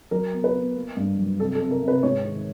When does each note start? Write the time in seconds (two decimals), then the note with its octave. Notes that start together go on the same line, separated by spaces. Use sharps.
0.11 F#3 A#4
0.33 B3
0.44 B4
0.54 B3
0.76 A#3
0.97 G2
1.18 F#3
1.39 C3 A4
1.55 A4
1.60 C3
1.71 A#4
1.83 C3
1.88 B4
2.03 G#2 C#5
2.25 D#3